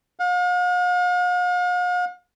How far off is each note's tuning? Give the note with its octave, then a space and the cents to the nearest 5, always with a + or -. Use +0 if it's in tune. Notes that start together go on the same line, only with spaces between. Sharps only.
F5 +45